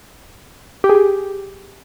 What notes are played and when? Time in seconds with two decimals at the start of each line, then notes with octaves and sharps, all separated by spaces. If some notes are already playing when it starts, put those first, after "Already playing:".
0.84 G4
0.89 G#4
0.95 G4